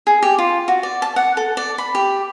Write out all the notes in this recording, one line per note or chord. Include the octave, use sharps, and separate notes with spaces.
G#4
G4
F4
F#4
D5
A5
F#5
A4
D5
B5
G4